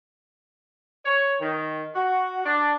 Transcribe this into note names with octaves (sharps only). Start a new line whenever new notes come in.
C#5
D#3
F#4
D4